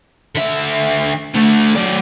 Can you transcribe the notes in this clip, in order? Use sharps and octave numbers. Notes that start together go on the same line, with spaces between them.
D3 E5
D3 A3
F#3 D5